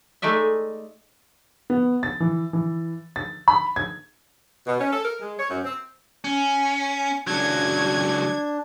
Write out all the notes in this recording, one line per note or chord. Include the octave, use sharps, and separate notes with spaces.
G#3 A3 D#4 D5 E5
B3
A6
E3
E3
A6
B5
G#6
B2
C#4
A4
A#4
G#3
C#5
F#2
C4
C#4
C#2 F#3 D4 G#6